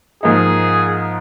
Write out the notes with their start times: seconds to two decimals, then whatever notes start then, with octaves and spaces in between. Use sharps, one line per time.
0.23 G#2 F3 A#3 D#4 G#4